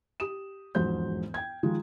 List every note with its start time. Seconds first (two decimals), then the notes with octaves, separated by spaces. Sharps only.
0.20 G4 D#6 E7
0.75 E1 F2 G#2 F#3 C5 G6
1.34 G5 G#6
1.63 D#3 F3 G#3